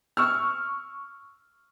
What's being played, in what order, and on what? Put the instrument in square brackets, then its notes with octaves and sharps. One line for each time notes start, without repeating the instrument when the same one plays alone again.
[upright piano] C#6 E6 F6